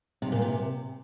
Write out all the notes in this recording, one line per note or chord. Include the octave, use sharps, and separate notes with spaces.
C3
A#2
C3